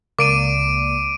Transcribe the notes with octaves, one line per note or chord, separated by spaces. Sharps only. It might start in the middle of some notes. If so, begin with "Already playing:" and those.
C#2 A#3 D5 D6 D7 D#7